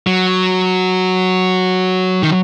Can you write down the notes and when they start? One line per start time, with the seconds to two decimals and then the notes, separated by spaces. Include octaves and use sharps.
0.07 F#3
2.23 D#3